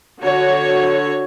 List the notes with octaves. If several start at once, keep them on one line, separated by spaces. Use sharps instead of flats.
D3 F#4 C#5